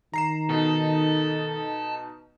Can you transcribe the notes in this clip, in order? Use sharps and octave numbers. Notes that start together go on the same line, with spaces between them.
D#3 A#5 C7 E7
B2 D#4 A4